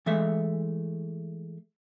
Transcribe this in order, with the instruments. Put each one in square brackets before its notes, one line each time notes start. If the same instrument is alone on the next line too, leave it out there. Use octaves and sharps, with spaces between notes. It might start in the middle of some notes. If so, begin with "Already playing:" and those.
[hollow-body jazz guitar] E3 G#3 A3 E5